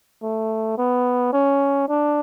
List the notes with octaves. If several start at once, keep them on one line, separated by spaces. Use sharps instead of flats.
A3
B3
C#4
D4